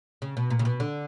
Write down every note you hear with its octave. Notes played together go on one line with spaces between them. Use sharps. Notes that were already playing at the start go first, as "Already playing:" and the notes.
C#3
B2
A#2
C#3
B2
D3